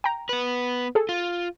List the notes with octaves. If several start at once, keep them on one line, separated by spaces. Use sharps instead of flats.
G5 A#5
B3 B4
G#4 A4
F4